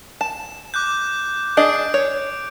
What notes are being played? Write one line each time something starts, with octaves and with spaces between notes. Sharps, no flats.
A5 E7
D6 F#6 G6
D4 G#4 D#5 D7
C#5